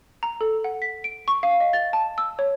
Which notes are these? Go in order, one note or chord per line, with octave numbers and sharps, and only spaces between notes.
A#5
A4
F#5
B6
D7
C#6
F5
D#5
A6
A5
E6
C#5